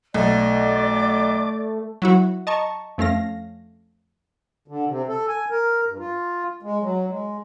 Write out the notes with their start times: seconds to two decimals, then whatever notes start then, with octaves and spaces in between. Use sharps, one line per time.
0.14 B1 A3 D5
0.59 D6
2.02 F#3 E4 F#4
2.47 D#5 A5 A#5 C#6
2.98 F2 A3 C#4 F5 A#6
4.68 D3
4.87 C3
5.09 A4
5.28 G#5
5.50 A#4
5.87 G2
5.99 F4
6.63 G#3
6.82 F#3
7.07 G#3